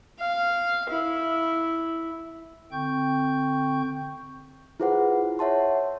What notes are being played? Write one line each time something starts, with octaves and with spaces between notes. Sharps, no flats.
F5
E4
D3 C4 G5 C#6 G6
E4 F4 G#4 B4 C5 F#5
C#5 E5 F#5 A5 C6